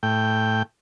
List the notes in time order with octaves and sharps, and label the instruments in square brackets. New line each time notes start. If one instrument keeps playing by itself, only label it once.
[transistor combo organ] A2 G5